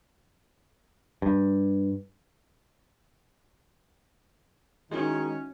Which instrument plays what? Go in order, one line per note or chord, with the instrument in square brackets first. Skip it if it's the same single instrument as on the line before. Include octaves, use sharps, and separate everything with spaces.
[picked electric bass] G2
[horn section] D#3 [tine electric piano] G#3 [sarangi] C#4 [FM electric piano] D#4 E4 F#4